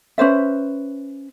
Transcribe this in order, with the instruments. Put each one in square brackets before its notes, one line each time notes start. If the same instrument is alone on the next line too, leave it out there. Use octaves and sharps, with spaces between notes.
[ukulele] C#4 B4 C5 E5